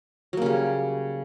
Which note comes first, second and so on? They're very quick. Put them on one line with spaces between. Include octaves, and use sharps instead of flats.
F#3 A#3 C#3 G3